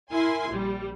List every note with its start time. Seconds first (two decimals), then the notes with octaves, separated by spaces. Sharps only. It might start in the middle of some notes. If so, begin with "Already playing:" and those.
0.11 E4 A#4 G#5 C6
0.51 A#1 G3